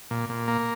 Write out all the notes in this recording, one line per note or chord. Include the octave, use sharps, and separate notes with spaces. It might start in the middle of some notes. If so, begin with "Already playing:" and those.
A#2
A#2
A#3